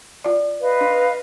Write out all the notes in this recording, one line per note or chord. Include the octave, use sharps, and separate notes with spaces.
F4 D5
B4 D#5 F5
D4